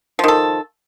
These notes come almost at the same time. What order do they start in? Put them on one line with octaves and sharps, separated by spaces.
F3 D#3 A4